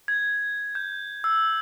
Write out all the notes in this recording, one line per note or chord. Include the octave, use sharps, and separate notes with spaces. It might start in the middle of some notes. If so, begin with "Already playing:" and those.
G#6
G6
E6